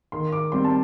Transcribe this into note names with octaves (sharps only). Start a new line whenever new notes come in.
D#3 C6
D6
G3 C4 C6
A5